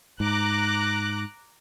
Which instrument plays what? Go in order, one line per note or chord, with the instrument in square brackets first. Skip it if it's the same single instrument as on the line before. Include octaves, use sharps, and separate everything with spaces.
[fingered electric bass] G#2 [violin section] A#5 D6 F#6